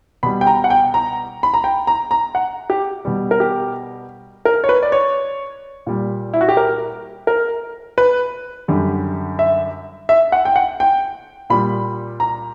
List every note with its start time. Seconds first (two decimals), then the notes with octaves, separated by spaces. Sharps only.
0.23 B2 G3 B5
0.41 G5
0.47 A#5
0.64 F#5
0.70 G5
0.94 A#5
1.43 B5
1.54 A#5
1.64 G5
1.87 A#5
2.11 A#5
2.35 F#5
2.70 G4
3.05 B2 G3
3.31 A#4
3.40 G4
4.45 A#4
4.64 C#5
4.69 B4
4.83 D5
4.92 C#5
5.87 A#2 G3
6.34 E4
6.41 F#4
6.49 G4
6.57 A#4
7.27 A#4
7.98 B4
8.68 F#2 D3 G3
9.39 E5
10.09 E5
10.32 F#5
10.45 G5
10.56 F#5
10.80 G5
11.50 A#2 G3 B5
12.20 A#5